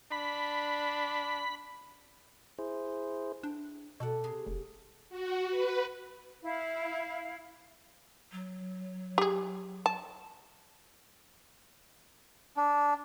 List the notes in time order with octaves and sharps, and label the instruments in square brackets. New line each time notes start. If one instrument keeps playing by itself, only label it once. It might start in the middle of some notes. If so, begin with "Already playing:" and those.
[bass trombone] D4 [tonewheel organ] B5
[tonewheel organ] E4 G#4 C5
[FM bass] D4 [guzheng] G5
[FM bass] B2 [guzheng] A4 D5 F#5
[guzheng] C3 G#4 C6
[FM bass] F1
[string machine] F#4
B4
[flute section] E4 F5
[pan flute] F#3
[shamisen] G4 G#4
A5
[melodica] D4